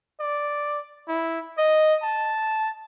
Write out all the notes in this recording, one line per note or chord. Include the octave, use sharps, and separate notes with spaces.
D5
E4
D#5
A5